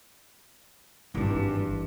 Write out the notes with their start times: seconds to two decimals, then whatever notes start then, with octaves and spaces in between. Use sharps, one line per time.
1.15 G#1 G2 E3